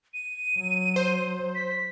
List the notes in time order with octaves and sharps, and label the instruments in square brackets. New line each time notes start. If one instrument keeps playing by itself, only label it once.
[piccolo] D#7
[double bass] F#3
[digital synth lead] C5
[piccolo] B6